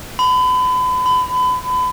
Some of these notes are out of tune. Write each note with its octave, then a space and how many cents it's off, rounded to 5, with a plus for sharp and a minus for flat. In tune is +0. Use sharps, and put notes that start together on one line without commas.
B5 +35
B5 +30